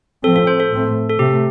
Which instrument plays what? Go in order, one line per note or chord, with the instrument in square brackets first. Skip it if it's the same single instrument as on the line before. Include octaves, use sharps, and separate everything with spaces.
[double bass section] A2 F3 C4 [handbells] A4
[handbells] A4
C5
A4
[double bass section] A2 A3 C4
[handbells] A4
[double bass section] C3 A3 [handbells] G4